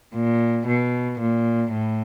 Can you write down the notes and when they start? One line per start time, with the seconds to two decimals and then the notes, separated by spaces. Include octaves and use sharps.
0.15 A#2
0.67 B2
1.20 A#2
1.71 A2